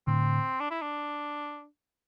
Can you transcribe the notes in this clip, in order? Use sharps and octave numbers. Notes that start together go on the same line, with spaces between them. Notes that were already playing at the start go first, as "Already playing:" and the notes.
A2 D3 C4
D4
E4
D4